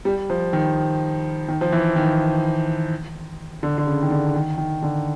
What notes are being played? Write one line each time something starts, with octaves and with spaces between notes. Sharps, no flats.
G3
F3
D#3
D#3
F3
E3
D#3
D3
D3
C#3
D#3
D3
D#3
D#3
D3